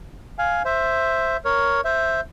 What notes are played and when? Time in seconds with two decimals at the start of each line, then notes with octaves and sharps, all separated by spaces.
0.38 F5 G#5
0.65 C5 E5
1.45 A#4 C#5
1.85 C5 E5